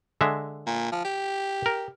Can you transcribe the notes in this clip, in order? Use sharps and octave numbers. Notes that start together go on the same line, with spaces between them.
D3 G#3 E5
A#2
F3
G4
A#4